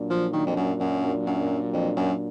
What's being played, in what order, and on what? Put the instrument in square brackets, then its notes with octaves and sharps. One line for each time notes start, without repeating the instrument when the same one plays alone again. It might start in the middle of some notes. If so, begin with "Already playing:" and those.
Already playing: [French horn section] A#2 F#3 D4
[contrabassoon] F3
D#3
F2
F#2
F#2
F#2
F2
F#2